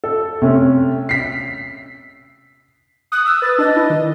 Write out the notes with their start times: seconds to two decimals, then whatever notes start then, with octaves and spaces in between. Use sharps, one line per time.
0.04 A4
0.42 C3 A3 C#4
1.09 B6 C7
3.12 D#6 F#6
3.25 E6
3.42 B4 A6
3.59 D4 D#5
3.76 E4
3.90 D#3